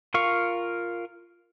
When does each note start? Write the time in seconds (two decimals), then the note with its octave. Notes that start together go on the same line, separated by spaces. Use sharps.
0.14 F4 A#4 F5 C#6